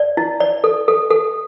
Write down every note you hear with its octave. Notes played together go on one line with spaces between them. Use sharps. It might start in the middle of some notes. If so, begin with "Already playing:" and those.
Already playing: D5
E4
D5
A4
A4
A4